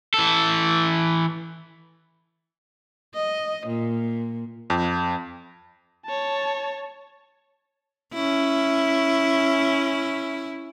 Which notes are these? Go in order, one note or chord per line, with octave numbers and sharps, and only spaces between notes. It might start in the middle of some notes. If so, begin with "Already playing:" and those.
E3 A4
D#5
A#2
F2
C#5 A5
C#4 E4